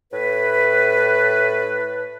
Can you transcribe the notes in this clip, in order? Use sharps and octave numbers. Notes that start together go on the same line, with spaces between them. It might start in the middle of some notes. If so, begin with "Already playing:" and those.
A2 B4